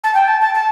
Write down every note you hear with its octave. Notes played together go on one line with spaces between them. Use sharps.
A5
G5
A5
A5
A5